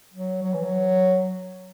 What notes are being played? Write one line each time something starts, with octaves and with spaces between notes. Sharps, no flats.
F#3
F#3
E3
F#3